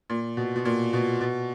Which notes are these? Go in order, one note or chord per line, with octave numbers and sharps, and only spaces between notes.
A#2
B2
B2
A#2
B2
B2